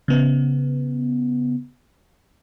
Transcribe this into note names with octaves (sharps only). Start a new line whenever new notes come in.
C#3 B3